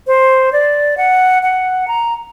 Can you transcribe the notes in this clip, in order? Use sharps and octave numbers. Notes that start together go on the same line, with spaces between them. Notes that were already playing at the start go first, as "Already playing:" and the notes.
C5
D5
F#5
F#5
A#5